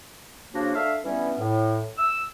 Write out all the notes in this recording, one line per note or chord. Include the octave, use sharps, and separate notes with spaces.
C#3 F3 A#3 D4 F4 F#4
A3 D4 E5 F5
G2 E3 G3 B3 C#4
A2
E6